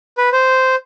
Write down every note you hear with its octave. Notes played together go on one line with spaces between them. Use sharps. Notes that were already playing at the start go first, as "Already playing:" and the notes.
B4
C5